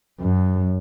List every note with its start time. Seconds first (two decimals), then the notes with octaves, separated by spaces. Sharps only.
0.21 F#2